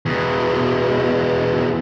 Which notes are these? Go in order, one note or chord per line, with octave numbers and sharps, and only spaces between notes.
E2 B2